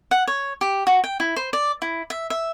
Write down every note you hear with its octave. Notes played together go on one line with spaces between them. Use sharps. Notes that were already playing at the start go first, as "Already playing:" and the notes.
F#5
C#5
G4
F#4
G5
E4
C5
D5
E4
E5
E5